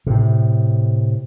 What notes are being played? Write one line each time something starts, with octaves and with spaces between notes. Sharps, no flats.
A2 C3